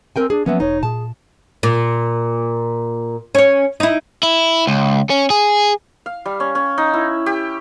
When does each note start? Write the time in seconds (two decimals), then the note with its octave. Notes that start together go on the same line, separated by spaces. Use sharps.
0.16 C4 A#4 G5 G#5
0.30 D4 G#4
0.46 F3 F#3 A#3 B3 C#4 E5
0.60 E1 D#4 C#5
0.83 A#2 G#4 A5
1.63 A#2
3.35 C#4 C#5
3.80 D#4 E4
4.23 E4
4.67 C#2
5.10 C#4
5.30 G#4
6.06 F5
6.26 G3
6.40 C#4
6.55 C#4
6.78 D#4
6.93 E4
7.26 G4